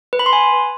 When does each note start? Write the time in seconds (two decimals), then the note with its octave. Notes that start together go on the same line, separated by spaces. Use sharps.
0.13 B4
0.19 B5
0.26 C6
0.33 G#5